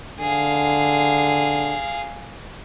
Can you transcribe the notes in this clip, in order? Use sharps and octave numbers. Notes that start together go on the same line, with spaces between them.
D3 G#4 F5